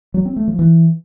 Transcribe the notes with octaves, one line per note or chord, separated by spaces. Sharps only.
F#3
C4
A3
F3
E3